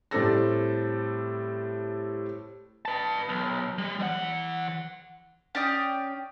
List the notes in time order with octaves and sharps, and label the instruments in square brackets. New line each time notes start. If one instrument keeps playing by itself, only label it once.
[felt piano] A2 G3 C4 A4 A#6
[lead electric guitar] B4 A5
B1
G3
E3 F#5
[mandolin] C#4 D5 G5 D#6